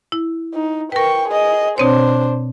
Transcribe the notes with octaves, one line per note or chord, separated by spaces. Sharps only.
E4
D#4
A#4 B4 G5 C#6
G#4 D#5
B2 C4 D4 C5 C#5